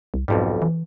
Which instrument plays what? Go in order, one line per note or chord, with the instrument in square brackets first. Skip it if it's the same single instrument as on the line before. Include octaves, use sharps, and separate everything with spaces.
[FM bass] C2
[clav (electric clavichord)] B1 F2 G3 [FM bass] G#2
[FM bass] E3